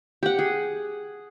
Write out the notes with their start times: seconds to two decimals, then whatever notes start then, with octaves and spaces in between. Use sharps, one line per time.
0.23 G4 F#5
0.39 G#4